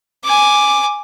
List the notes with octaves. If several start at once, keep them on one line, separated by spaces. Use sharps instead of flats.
G#5 D6